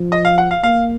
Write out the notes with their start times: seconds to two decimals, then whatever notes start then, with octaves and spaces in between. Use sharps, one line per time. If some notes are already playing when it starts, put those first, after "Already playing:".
Already playing: F3
0.12 D#5
0.25 F5
0.38 F#5
0.51 F5
0.63 A#3 F5